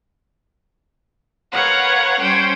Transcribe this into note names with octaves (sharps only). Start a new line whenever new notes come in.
A#4 B4 C#5 F5 F#5
G3 C#4 C5 G5 G#6